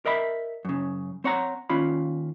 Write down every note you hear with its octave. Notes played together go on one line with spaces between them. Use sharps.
A#4 D#5 E5 B5
F#2 C#3
C4 C#5 F#5 A#5
D#2 C#4 F4 B5